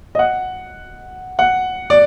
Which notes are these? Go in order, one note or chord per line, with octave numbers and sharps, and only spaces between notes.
D#5
F#5
F#5
D5